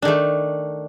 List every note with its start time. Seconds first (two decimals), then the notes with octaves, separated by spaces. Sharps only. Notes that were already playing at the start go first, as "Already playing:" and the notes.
0.02 D4
0.05 D#3
0.08 A3